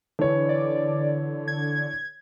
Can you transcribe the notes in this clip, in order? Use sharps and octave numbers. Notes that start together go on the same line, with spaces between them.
D3 E3 C#5
D5
G#6